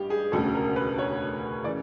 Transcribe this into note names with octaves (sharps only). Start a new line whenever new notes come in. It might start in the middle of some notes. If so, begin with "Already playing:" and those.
Already playing: A1 G2 G4
G#4
E1 D2 C#3 A4
A#4
B4
C#5
C#3 E3 D5